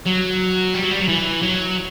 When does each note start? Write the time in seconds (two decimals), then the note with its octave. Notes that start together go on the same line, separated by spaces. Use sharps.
0.06 F#3
0.74 G3
0.83 F#3
0.91 G3
1.00 F#3
1.08 E3
1.42 F#3